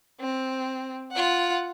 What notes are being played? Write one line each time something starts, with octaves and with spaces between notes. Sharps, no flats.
C4
F4 F#5